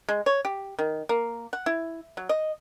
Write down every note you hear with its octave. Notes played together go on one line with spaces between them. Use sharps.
G#3
C#5
G4
D#3
A#3
F#5
E4
F#3
D#5